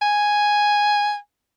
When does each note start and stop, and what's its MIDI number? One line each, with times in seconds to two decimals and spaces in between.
0.02 1.16 80